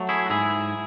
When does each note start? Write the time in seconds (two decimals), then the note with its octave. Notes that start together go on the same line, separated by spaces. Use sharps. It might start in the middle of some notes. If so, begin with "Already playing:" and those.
Already playing: F#3 A3
0.09 E4 G#4
0.26 F#4
0.30 G#2 E4 G#4